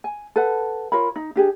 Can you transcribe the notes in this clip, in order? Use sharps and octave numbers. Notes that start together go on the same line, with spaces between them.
G#5
A4 B4 F#5
F4 A#4 C#5 B5
D#4
D4 G4 G#4